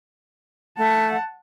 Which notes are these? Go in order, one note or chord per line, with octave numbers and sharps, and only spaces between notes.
A3 F#5 A5